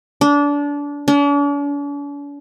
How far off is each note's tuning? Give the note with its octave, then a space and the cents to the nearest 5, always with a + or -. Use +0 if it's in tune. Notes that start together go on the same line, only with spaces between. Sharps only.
D4 -25
D4 -45